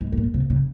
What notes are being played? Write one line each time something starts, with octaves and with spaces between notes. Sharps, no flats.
G#2
G#2
A#2
C3
C#3